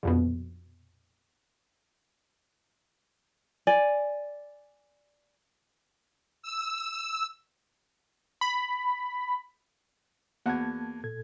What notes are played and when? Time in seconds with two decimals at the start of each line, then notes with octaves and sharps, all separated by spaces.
0.03 A#1 F2 B2
3.67 D5 G#5
6.42 E6
8.41 B5
10.46 E2 A#3 F#4 F#5 A5 G#6
11.04 A#2 A4 G#6